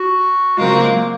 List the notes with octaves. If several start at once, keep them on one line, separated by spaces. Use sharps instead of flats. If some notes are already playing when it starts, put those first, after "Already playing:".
Already playing: F#4
C#3 F#3 G#3 C4 F4 A#4
F#4
A#3
G#3
A#3